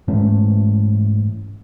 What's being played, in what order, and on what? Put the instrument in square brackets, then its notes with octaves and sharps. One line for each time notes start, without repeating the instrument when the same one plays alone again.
[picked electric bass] G#2 E3 A3 C#4